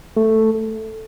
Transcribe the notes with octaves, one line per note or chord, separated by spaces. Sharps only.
A3